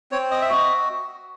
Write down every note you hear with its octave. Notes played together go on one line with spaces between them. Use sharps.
C4 C#5
D#5
E5
F#4 D#5